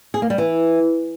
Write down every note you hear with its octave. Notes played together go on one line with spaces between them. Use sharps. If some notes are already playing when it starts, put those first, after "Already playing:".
G#4
A#3
G3
E3